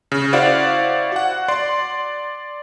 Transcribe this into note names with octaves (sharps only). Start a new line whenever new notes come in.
C#3
E4 F#4 C5 D5 F5 F#5
F#4 F#5
D5 C6